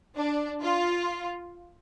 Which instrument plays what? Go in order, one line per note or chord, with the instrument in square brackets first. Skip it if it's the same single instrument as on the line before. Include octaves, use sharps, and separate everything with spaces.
[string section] D4
F4